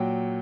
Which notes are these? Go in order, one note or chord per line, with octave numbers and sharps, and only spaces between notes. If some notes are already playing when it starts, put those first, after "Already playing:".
Already playing: A#2 F#3 G5